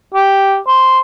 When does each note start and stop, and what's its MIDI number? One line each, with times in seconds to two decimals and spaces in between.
0.14 0.57 67
0.67 0.99 72